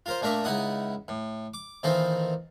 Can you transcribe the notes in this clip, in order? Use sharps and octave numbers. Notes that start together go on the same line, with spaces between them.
F4 A#4 C5
A#2 A3 D4 A#4 E5
C#2 D#4 E4 F#5 D#6
A2
D6
A#2 D#3 E3 C4 D#4 A4